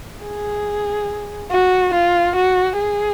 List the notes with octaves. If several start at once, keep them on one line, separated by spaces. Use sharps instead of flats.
G#4
F#4
F4
F#4
G#4